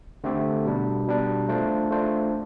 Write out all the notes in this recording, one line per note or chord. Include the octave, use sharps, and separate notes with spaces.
D3 A3 C4 G4
B2 G3 D4
B2 G3 D4
A3 D4 F4 C5
A3 D4 F4 C5